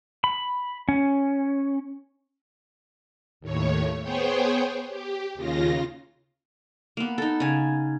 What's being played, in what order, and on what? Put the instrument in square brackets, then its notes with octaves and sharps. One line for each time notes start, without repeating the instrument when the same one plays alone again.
[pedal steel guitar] B5
C#4
[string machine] D#2 A2 C#5
B3 G#4 C5 C#5 G5
G4
D#2 C#3 F4 A#6
[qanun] A#3 B3
D#4 A4
C#3 G#5